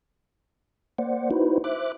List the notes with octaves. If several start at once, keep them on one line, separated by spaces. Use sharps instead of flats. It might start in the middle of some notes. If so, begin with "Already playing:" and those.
A#3 C5 D5 F#5
D#4 E4 F#4 B4 C5
C5 E5 D6 F#6